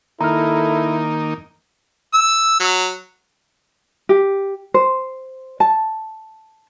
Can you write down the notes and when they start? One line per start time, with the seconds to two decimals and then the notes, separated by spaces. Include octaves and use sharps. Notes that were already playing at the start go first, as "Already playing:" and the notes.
0.21 D#3 A#3 D#4 E4 A4 A#5 F6
2.13 E6
2.60 F#3
4.09 G4
4.74 C5
5.60 A5